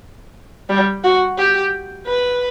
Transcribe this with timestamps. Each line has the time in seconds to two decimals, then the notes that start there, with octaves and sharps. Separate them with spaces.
0.69 G3
1.04 F#4
1.38 G4
2.07 B4